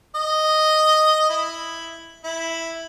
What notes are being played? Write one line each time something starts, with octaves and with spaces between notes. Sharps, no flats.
D#5
E4
E4